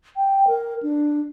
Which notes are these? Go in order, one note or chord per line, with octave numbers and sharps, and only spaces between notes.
G5
A#4
D4